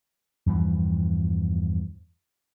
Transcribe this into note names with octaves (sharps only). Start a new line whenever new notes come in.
E2 G2 E3 F3